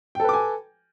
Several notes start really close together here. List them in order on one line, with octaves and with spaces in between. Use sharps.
G5 A4 B4 D6 G#5